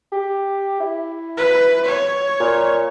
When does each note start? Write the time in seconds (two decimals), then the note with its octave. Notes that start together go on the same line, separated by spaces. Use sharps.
0.12 G4
0.80 E4
1.37 B4
1.85 C#5
2.40 A#2